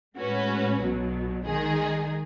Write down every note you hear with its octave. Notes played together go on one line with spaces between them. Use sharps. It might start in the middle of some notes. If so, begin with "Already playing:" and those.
A2 G#3 C#4 F#4 B4
B1 B2 F#3
D#3 G#3 D#4 G#4